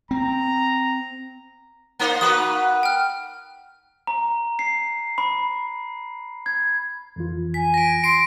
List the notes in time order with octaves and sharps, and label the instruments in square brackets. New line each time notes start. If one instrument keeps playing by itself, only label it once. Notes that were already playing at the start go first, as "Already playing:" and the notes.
[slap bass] C4 [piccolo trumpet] A#5
[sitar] A#3 D#4 C5
[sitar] A#3 F#4 B4 [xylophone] D#6
[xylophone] G5 F6
[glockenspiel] A#5
C7
B5
G#6
[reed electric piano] F2 E3 F4
[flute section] G#5 [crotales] B6
[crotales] A#6 D7
[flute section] C6 [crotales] A#6 C7 [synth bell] D7